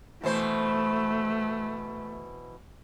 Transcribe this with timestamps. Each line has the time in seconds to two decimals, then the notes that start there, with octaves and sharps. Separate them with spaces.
0.24 B2 E3 A3 C5